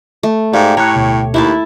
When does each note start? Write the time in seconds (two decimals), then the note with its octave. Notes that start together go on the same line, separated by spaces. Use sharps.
0.23 A3
0.53 G#2 G4 D5 F5 G5
0.77 A2 C#5 A#5 F#6
0.96 D2 B2
1.34 D#2 E4 E5 A5